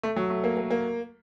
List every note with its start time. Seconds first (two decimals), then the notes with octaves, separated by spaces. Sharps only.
0.03 A3
0.16 F#3
0.30 A3
0.44 A#3
0.57 A#3
0.70 A#3